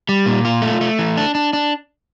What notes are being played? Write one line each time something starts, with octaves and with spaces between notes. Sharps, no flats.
G3
A#2
F4
A3
A3
E3
D4
D4
D4